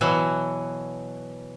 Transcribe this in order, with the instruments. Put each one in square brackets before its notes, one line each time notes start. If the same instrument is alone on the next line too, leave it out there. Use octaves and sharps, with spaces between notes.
[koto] B2 E3 F#3